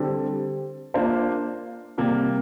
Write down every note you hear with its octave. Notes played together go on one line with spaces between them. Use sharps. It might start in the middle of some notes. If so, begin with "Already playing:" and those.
Already playing: D3 G3 C4
A#3 D4 F4 C5
C3 G3 A#3